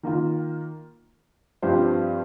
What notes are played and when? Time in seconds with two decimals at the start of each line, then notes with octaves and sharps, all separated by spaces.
0.03 D#3 A#3 F4
1.62 G2 F3 C4 G4 C5